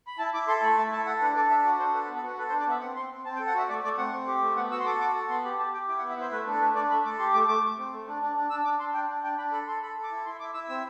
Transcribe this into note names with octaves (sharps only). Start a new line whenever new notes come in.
B5
E4 A5
E4 D6
A4 C6
A3 B5
E4 A5
A4 A5
A4 F#5
D4 B4
A4 D5
D4 E5
F#4 D5
D4 C5
A4 B4
B4
B3
A4
F#4 B4
A4 B4
C5
D4
D5
B3 E5
C4 F#5
C4 C6
C4
C4 A5
G5
A4
F#5
F#4 E5
A3 D5
A3 D5
C4 F#5
C4
G4
A3
B3 F#5
F#4 E6
C6
A4 D6
F#4 D6
A4
B3 C6
G4 B5
G4 A5
G4 G5
E4 G5
F#5
B3
E5
E4 C5
A3 B4
D4 A4
A3 B4
D4 D5
A3 B5
A4 D6
G4 C6
A3 D6
A3 D6
A3
C4
A3
D4
D4
D4
D4 E6
D4 D6
D4 C6
D4 G5
D4
D4 G5
D4 B5
A4 B5
A4 C6
A4 B5
A4
D6
E4
E4 C6
E4 D6
E4 E6
C4 E6